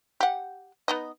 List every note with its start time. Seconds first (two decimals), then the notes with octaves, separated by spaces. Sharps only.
0.20 G4 F#5
0.88 B3 D#4 D#5